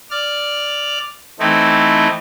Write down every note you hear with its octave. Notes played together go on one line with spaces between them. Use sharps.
D5 F6
E3 A3 C4 D#4 E4